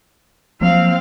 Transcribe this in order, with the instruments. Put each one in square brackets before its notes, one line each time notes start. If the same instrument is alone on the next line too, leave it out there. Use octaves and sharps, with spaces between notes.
[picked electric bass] F3 F#3 A#3 [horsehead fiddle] C4 F5